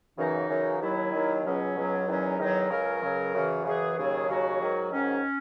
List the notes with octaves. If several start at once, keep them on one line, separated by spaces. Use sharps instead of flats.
F#2 C#3 E3 D#4
F#2 C#3 E3
D#2 D#3 F#3 E4
D#2 D#3 F#3
C#2 B2 F#3 C#4
C#2 B2 F#3
E2 D#3 F#3 C#4
E2 D#3 F#3 D#4
C#2 C#3 F#3 A#4
C#2 C#3 F#3
F#2 C#3 E3
F#2 C#3 E3 G#4
D#2 C#3 F#3 G#4
D#2 C#3 F#3 F#4
G#2 D#3 F#3
G#2 D#3 F#3 C#4